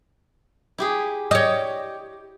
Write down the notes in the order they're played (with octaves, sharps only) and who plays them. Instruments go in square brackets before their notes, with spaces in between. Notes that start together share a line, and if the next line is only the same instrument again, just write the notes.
[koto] E4 G4 G#4
[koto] G4 [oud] C#5 D#5